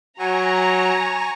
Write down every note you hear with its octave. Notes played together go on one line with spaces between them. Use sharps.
F#3 G#5 A#5 C#6